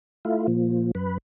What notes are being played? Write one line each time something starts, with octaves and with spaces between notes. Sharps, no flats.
A3 E4 F4
A#2 F3
F#2 B4